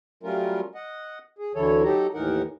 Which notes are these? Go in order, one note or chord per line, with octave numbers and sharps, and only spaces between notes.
F#3 G3 A3 C#4 F4 A#4
D#5 F#5
G#4
D2 D3 E3 E4 A4 C#5
F#3 D#4 G4 A4 A#5
D#2 A2 E3 D#4 A#4 F#5